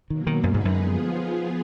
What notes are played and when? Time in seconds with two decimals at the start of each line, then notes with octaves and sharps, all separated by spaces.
0.10 B2 D#3 F#3 A#3
0.27 D#3
0.43 F#2 D3 G#3 D#4 G#4 B4
0.54 G#2
0.65 F#2
0.77 F3 B3 F4 G#4